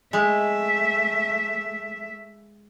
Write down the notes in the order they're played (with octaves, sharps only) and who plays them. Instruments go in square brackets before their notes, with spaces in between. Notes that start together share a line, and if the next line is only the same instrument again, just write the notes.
[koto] G#3 [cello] A3 E5